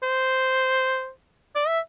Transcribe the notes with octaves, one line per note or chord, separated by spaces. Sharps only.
C5
D5
E5